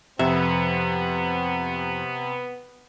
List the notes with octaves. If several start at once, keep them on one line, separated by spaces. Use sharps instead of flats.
F2 C3 B3 E5